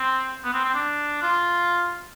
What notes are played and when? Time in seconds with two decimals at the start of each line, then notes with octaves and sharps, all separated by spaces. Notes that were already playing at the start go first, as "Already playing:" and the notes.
Already playing: C4
0.44 B3
0.54 C4
0.64 C4
0.74 D4
1.23 F4